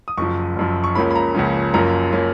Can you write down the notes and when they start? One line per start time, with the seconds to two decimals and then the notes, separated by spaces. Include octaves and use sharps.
0.08 D#6
0.17 F#1 F#2 F3 C#6
0.56 F#1 F#2 F3
0.84 C#6
0.95 C#2 C#3 F3 A#3 C#4 B5
1.10 B5
1.15 A#5
1.35 C#2 C#3 F3 A#3 C#4
1.74 F#1 F#2 F3 A#3 C#4 A#5
2.12 F3 A#3 C#4